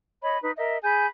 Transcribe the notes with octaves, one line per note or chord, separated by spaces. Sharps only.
C#5 D#5 B5
D#4 B4
A#4 D#5 E5
G#4 G#5 B5 G6